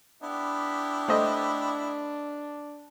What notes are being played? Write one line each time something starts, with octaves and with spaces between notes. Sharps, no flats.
B3 D4 E4 G4
A3 C5 D#5